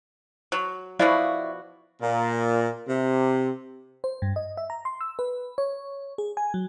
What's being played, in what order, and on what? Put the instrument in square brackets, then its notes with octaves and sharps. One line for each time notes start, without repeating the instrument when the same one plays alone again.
[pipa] F#3
[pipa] B2 F3 F#4 [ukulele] E4 D5 F5
[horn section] A#2
C3
[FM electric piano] C5
G2
D#5
E5
A#5
C6
E6
B4
C#5
G#4
G#5
F#3